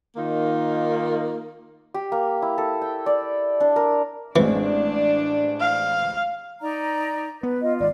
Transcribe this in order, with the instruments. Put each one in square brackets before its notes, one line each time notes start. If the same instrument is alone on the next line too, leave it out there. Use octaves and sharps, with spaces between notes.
[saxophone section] D#3 A#3 D#4 F4
[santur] G4
A#3
E4
A4
G5
D5
D4
A#4
[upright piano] A1 G#3 C4 [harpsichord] E3 [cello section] D4
[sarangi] F5
[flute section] D#4 D5 A#5
[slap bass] B3 [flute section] B4
[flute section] F4 [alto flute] D#5
[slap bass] G#1 G#3 [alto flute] D5